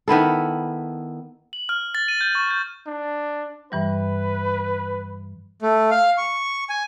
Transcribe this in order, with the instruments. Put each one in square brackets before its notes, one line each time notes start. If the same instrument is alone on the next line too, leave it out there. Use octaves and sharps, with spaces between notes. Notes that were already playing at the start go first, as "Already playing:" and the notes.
[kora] D#3 B3 E4 A4
[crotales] F#7
F6
A6
D#7
G6
C#6
G6
[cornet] D4
[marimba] G2 E3 G3 [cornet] B4
[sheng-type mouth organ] A3
F5
C#6
G#5